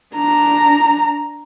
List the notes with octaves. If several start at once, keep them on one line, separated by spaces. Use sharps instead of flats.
D4 A#5